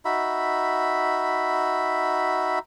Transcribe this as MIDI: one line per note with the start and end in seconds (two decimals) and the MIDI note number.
0.05 2.59 63
0.05 2.59 66
0.05 2.59 76
0.05 2.59 83